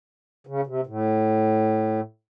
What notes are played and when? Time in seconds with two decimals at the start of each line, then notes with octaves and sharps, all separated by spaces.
0.47 C#3
0.67 C3
0.87 A2